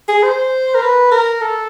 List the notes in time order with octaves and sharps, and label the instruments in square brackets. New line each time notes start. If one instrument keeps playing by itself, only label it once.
[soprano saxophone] G#4
C5
A#4
B4
A#4
A4